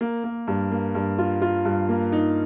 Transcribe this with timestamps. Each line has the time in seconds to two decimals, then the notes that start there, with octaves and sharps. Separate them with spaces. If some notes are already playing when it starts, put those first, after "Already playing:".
0.01 A#3
0.24 A#3
0.48 G2
0.72 A#3
0.95 G2
1.18 F4
1.42 F4
1.65 G2
1.89 A#3
2.12 D#4